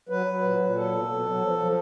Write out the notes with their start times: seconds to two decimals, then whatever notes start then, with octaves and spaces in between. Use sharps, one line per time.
0.09 F#3 B4
0.26 F#3
0.42 A#2
0.59 A#2
0.75 F#3 A4
0.92 B2
1.08 B2
1.25 F#3
1.42 F3
1.58 F3